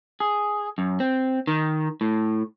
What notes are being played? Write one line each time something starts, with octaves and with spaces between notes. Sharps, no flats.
G#4
F#2
C4
D#3
A2